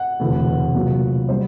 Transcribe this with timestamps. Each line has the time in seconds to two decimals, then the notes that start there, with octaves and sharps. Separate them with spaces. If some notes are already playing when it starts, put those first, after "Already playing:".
Already playing: F#5
0.20 E1 D2 C3 E3 A3
0.75 C2 A#2 F#3 A#3
1.29 B2 G3 C5